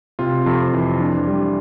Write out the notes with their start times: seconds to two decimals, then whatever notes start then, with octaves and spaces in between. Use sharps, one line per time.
0.19 C3 F4
0.46 F2
0.73 E3
1.00 D4
1.27 G3